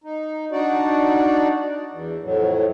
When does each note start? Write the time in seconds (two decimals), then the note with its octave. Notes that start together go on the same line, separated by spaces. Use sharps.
0.04 D#4
0.52 D4 D#4 F#4 D5
1.90 E2
2.22 F2 A2 F#3